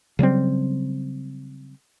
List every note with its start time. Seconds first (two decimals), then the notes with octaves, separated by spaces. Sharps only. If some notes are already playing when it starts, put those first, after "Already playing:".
0.19 C#3 F#3 G3 C4